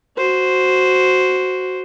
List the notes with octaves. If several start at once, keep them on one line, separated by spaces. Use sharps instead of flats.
F#4 C5